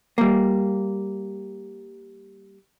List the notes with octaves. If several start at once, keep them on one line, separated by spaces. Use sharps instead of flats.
G3 A#3